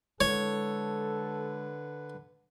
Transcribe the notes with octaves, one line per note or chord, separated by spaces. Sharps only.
D3 G#3 E4 A4 B4 C#5